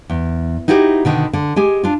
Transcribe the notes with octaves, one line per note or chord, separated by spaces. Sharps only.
E2
D#4 E4 F#4 G4 A#4 C5
B2 D3 D#3
D3
G#3 G4 G#5
D4 F4